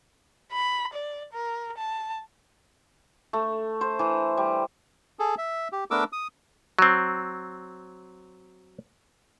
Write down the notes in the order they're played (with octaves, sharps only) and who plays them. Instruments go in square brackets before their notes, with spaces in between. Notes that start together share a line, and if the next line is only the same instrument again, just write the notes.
[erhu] B5
D5
A#4
A5
[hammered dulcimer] A3
C5
E3
G3
[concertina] G#4 A4
E5
G4
A3 B3 D4 A#4 D6 E6
D#6
[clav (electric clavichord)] F#3 C4